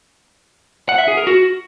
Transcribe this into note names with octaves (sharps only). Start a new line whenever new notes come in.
F#5
E5
G#4
A#4
F#4